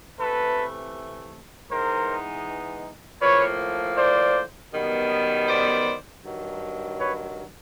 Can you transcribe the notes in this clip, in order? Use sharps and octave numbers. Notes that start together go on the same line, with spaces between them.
C3 E3 A3 A4 B4
E3 G#3 B3 D#4 A#4 C5
A2 F3 A#3 B4 C#5
C5 D5
F#2 D#3 G3 B3
C5 D5
G2 D#3 F#3
B4 C#5